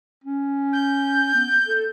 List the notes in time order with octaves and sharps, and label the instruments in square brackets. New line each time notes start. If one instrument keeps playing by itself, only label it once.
[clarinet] C#4
[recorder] G6
[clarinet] B3
A4